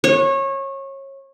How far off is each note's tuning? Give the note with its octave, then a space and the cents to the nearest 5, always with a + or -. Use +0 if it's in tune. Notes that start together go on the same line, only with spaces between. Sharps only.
C#5 -25